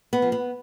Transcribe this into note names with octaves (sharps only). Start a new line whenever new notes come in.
B3
F3
B3